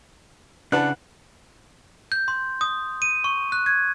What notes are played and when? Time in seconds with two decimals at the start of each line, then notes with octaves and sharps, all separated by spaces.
0.72 C#3 D4 E4 B4 F#5 A5 F#6
2.12 G6
2.28 C6
2.61 D#6
3.02 D#7
3.24 C#6
3.52 F#6
3.66 G#6